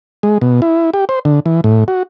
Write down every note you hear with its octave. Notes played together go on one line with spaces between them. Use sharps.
G#3
B2
E4
G4
C5
D3
E3
A2
F#4